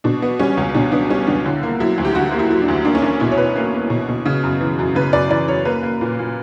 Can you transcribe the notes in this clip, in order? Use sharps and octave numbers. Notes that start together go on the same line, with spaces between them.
B2 D4
B3
G3 C#4
C#2
B2 D4
B3 D4
G3 C#4
C#2 D4
D3 E4
A#3
F#3 E4
D2
G4
D3 F#4
A#3
E4
F#3
D4
D2
A#3 D4
C#4
A#3 D4
B2 E4
C#5
B2 B4
A#3
A#3
B2
B2
C#3
F#2
E3
F#2
C#3 B4
F#2 D5
E3 D5
F#2 C#5
A#3 B4
A#3
A#2
A#2